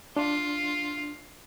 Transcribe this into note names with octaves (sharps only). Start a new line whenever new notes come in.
D4 F4